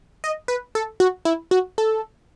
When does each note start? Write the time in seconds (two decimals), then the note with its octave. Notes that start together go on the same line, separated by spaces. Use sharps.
0.24 D#5
0.48 B4
0.75 A4
1.00 F#4
1.25 E4
1.51 F#4
1.78 A4